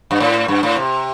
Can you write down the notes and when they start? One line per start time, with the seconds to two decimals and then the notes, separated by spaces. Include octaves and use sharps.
0.11 G2
0.20 A2
0.48 G2
0.63 A2
0.76 C3